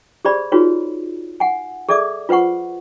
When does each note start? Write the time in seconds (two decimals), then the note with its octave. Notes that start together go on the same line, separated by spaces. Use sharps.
0.25 G4 G#4 C5 D5 B5
0.52 D#4 F4 F#4 G#4 B4 C#5
1.40 F#5 G#5
1.89 G#4 A4 D5 E5 D6
2.29 F4 B4 C5 F#5 C#6